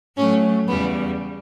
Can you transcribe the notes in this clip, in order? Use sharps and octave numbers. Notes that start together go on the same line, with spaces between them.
A2 F#3 A3 C#4
E2 C#3 G3 B3